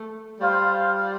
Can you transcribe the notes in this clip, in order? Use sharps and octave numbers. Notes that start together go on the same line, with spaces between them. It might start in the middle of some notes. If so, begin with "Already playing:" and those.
Already playing: A3
G3 F4 C5 F5